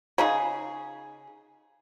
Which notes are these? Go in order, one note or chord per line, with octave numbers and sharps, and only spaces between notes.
C#3 D#4 G#4